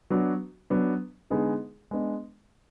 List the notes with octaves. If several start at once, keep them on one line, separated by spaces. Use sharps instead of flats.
F#3 B3 D4 F#4
F#3 B3 D4
D3 G#3 B3 D#4 G#4
G#3 B3 D4